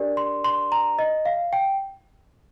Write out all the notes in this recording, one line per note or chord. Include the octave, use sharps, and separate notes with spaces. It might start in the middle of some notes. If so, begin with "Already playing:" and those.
Already playing: D4 G4 A#4 D5
C6
C6
A#5
D#5
F5
G5